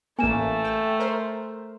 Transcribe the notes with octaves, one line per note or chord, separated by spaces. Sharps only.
A1 A3 A#3 G#5 E7
G5
A#4 C5